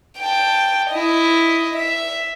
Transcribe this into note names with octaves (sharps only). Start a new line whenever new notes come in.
G5 A5
E4 D#5
E5